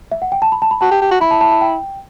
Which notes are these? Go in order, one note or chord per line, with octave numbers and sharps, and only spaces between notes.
E5
F#5
G5
A5
B5
A5
B5
F#4 A5
G4
G4
F#4
E4 B5
A5
A5
A5
G5